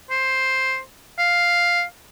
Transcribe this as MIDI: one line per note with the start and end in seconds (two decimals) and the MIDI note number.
0.11 0.80 72
1.19 1.83 77